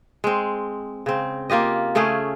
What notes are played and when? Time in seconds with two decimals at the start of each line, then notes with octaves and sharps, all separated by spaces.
0.24 G#3 C4
1.06 C#3 C4
1.50 A#3 F4 G4 D#5
1.95 C#3 A3 C#4 G#4